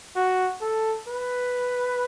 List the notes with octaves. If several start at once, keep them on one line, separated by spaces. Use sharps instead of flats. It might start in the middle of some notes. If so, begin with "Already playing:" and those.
F#4
A4
B4